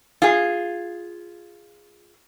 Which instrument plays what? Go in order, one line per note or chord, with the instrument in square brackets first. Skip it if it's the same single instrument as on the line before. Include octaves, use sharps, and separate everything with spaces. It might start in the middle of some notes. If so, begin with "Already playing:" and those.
[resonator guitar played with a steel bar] F4 G#4